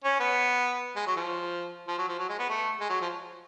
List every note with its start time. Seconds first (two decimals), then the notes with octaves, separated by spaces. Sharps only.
0.04 C#4
0.20 B3
0.96 G#3
1.07 F#3
1.16 F3
1.88 F3
1.98 F#3
2.08 F3
2.19 F#3
2.29 G#3
2.39 B3
2.49 A3
2.80 G#3
2.90 F#3
3.01 F3